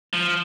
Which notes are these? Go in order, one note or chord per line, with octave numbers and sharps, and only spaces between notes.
F3